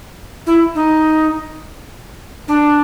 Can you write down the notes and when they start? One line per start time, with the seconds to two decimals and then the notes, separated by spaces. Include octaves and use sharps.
0.46 E4
0.75 D#4
2.48 D4